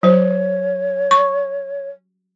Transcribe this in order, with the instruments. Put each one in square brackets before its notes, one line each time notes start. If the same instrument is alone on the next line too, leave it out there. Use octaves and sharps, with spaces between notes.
[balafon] F#3 C5 [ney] C#5
[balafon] C#6